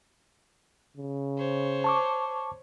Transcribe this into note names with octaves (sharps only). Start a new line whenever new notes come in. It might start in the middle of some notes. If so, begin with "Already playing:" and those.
C#3
C5 C#5
A5 C#6 D6